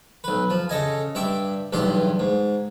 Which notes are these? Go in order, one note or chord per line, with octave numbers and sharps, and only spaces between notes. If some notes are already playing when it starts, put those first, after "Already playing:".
B1 B4
F3
C#3 A4 D#5 G#5
G2 E5 G5 D6
B1 E2 G2 G4 C6
G#2